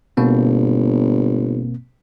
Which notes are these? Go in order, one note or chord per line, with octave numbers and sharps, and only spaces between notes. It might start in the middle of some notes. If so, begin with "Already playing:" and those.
G1 B2 A#3 C4